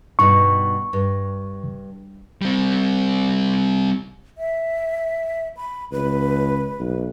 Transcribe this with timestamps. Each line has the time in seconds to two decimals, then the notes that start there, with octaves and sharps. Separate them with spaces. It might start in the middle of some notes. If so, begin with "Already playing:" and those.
0.19 G2 B2 D#4 C#6
0.93 G2
2.42 G3 C4
4.38 E5
5.57 B5
5.92 C#2 B4
6.79 B1